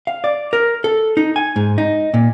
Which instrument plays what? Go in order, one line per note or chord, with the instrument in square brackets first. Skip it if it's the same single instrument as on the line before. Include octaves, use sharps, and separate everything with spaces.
[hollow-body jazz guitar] F5
D5
A#4
A4
D#4
G#5
G#2
D#4
A#2